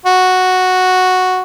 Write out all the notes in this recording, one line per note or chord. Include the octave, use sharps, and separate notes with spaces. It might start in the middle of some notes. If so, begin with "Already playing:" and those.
F#4